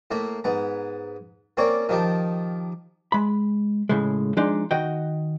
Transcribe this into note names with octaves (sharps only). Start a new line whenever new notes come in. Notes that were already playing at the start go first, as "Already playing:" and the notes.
A2 A#3 E5 A#5
G#2 B3 A#5
A#3 C4 C#4 A#4 C#5 D5
D#3 F3 D#4 G4 A5
G#3 B5
A2 C#3 G#3
F3 G#3 D4 D#4
D#3 F#4 D#5 F#5 G5